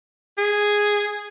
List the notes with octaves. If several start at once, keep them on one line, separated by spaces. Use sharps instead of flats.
G#4